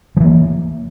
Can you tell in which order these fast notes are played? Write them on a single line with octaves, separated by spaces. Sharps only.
F3 E3 A#3